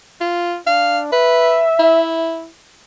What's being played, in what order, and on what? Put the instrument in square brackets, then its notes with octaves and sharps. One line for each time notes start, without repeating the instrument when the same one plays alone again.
[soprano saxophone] F4
[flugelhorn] D4 [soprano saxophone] F5
[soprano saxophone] B4 [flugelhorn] E5
[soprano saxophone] E4